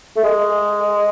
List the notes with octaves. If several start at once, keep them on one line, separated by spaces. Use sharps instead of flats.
A3
G#3